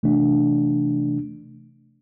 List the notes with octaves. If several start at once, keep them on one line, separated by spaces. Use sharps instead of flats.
C3 E3 A3 D4